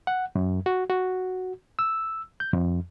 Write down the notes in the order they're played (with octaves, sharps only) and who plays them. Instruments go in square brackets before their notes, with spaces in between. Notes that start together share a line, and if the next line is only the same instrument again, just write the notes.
[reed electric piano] F#5
F#2
F#4
F#4
E6
G6
F2